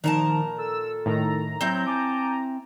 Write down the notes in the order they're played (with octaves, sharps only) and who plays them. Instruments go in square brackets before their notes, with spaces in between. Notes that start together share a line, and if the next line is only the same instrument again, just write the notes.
[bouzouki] A#2 A#4 A5 [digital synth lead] D#3 [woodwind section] F3
[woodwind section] A4 [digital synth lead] E6
[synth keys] A2 D#3 [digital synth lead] A#5
[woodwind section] F#3 [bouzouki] C4 E4 [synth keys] G6
[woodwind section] G#5 A5 D6